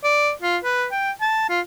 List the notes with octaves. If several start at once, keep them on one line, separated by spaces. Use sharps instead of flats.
D5
F4
B4
G5
A5
F4